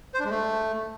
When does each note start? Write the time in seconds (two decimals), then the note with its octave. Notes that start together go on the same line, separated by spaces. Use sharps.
0.14 C5
0.20 D4
0.25 G#3
0.30 A3